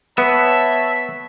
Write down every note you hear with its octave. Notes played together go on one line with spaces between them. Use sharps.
B3 C#5 E5 A5 B5